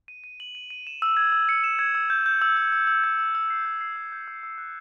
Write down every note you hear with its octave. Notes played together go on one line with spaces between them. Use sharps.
D#7
D#7
F#7
D#7
D#7
E7
E6
G#6
E6
C#7
E7
G#6
E6
G6
G6
E6
E6
E6
E6
G6
E6
E6
C7
G6
C7
E6
G6
E6
E6
F#6